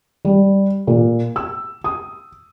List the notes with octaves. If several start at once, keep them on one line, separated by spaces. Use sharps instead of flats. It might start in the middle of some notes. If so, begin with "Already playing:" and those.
G3
A#2
E6
D#6